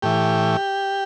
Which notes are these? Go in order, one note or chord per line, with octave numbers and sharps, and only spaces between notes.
A2 E3 G4